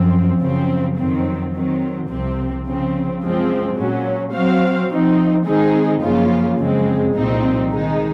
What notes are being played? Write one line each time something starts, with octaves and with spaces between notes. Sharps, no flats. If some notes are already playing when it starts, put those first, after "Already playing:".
Already playing: F#2 F3 C4
F#2 C#3 F3 C4
F2 D#3 F#3 C4
D#3 F#3 C4
C2 C3 F3 C4
C#3 F3 C4
F#2 F3 G#3 C4
A#2 F#3 C#4
F#3 C4 F#4 C5 F5
F3 C4 D#4
D#3 G#3 C4 D#4 G#4
F#2 C#3 F3 A#3 F4
F#2 C#3 F3 G#3 C4
C2 A#2 F3 C4 D#4
D#3 G#3 D#4